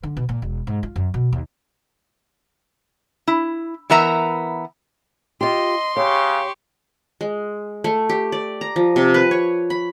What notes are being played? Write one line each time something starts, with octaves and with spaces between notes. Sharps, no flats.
D3
B2
A#2
E1
G#2
F4
F#2
B2
D#2
E4
E3 B3 A#4 E5 A#5
F4 G4 D#5 C6
C#3 G4 C#5 C#6
G#3
A3
G4
D5
A#5
F3
C3
B4
C#5
B5